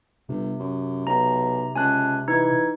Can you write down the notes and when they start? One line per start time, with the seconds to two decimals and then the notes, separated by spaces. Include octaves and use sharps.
0.29 G1 C3
0.60 F#2
1.07 B1 A#5
1.76 C#2 G#5 A5 F#6
2.28 E3 D#4 G#6